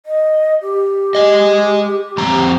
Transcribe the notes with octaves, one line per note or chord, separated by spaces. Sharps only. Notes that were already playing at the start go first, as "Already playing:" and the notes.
D#5
G4
G#4 D#5
F2 C4 A#5